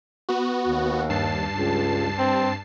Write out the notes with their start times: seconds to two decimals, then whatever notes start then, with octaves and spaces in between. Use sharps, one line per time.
0.29 B3 F#4
0.68 D#2
1.10 G2 A5 C7
1.58 C#2
2.19 C4